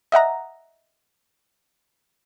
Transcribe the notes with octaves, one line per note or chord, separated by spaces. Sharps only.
D#5 E5 F#5 A#5